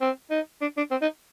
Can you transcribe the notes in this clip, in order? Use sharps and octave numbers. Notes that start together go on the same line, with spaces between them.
C4
D#4
D4
D4
C4
D#4